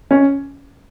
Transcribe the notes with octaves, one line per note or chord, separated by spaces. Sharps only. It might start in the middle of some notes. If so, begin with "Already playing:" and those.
C#4